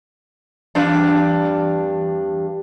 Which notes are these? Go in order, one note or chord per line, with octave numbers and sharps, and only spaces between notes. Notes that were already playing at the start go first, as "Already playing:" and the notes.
E2 G2 D4